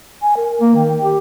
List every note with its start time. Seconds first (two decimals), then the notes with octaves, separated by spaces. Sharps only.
0.22 G#5
0.37 A#4
0.61 A#3
0.75 D#3 G5
1.02 G4